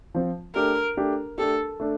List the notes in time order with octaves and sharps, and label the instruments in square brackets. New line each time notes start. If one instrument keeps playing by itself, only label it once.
[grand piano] F3 C4 F4
[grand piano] A3 D4 G4 [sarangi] A#4
[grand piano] A3 D4 G4
[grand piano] A3 D4 G4 [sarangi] A4
[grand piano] A3 D4